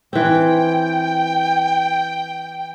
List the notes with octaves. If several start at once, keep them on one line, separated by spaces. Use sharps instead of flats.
E3 C4 G5